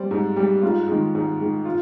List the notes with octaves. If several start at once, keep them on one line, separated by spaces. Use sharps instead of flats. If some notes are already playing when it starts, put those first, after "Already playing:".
Already playing: G3 C5 D5
G#2
G3
G#2 F4
D#3 G#3
G#2
D#3 G#3
F4